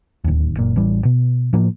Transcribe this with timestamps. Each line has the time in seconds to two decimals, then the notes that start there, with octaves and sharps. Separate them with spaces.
0.24 D1 D#2
0.57 F#1 A#2
0.76 A1 E3 G3
1.05 B2
1.53 A2 F3 A#3